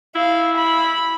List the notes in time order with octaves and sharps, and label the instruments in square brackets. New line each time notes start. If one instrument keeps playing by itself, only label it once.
[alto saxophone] E4 [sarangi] F5
[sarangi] B5